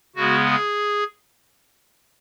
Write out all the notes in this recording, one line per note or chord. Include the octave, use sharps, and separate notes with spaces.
C#3 G#3 B3 F#4
G#4